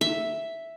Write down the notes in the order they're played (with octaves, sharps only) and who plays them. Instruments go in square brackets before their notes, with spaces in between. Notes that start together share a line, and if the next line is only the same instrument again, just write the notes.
[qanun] E5